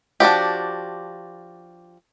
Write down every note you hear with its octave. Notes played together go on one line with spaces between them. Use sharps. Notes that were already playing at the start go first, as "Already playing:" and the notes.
F3 D4 F#4 G4